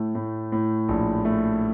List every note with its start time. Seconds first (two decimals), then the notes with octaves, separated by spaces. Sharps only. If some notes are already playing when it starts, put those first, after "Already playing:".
Already playing: A2 A3
0.15 A2
0.52 A2
0.89 A#1
1.25 A3